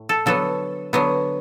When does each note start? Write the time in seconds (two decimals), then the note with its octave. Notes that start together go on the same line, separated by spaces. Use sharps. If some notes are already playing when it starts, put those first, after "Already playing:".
Already playing: A2
0.09 A4
0.26 D3 F#3 B3 A4
0.93 D3 F#3 B3